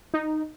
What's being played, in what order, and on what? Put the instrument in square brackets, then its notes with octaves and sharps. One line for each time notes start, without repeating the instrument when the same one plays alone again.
[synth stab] D#4